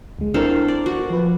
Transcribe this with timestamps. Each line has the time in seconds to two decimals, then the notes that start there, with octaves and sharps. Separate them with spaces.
0.19 D2 G#3
0.34 C4 D4 E4 A4 A#4 F5
0.68 D5
0.86 F#4
1.10 F3 B4